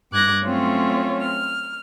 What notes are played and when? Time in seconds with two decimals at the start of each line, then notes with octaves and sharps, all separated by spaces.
0.11 G2 D6 F#6 G#6 A#6
0.43 F#3 A3 C4 C#4 F4 C#5
1.22 F6